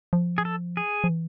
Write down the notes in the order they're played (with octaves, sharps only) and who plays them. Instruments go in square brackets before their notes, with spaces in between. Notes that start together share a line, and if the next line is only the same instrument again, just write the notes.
[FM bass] F3
[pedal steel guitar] G#4
A4
G#4
[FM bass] F3
E3